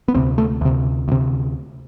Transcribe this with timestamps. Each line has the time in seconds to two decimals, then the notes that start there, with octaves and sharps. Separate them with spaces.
0.08 B3
0.14 D2 C3 C4
0.38 A3
0.61 D2 C3
1.08 D2 C3